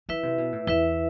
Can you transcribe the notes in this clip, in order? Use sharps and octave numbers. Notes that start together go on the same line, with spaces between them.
E3 E4 B4 E5
C3
B2
A2
E2 E4 B4 E5